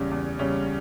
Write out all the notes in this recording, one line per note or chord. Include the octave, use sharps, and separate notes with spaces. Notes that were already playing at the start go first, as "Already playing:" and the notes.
Already playing: E2 C#3 G3 C#4
E2
C#3 G3 C#4